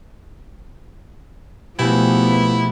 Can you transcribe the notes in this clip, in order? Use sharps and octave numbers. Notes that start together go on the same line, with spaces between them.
B2 F3 G#3 A3 B3 E4 G4